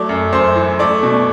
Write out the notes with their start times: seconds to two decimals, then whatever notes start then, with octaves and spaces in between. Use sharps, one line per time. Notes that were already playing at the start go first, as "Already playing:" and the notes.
Already playing: F#3 A3 D5 D6
0.09 F#2
0.32 F#2 C5 C6
0.56 E3
0.79 A3 D5 D6
1.03 B2